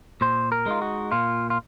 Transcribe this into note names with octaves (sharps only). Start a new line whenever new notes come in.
A#2 C5
A#4
G#3 D#4 F4
F#4
A#2 F4
F4